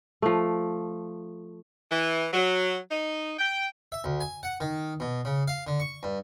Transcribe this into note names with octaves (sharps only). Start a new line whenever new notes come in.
F3 A3
E3
F#3
D#4
G5
E5
D2
G#5
F#5
D#3
B2
C#3
F5
D3
C#6
G2